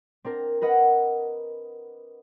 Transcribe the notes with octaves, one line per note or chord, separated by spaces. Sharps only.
C4 D4 A#4
A#4 B4 D#5 F#5